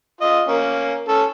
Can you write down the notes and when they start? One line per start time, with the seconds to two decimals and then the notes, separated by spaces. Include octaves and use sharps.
0.21 F4 D#5
0.48 A#3 C#4
1.08 C#4 A4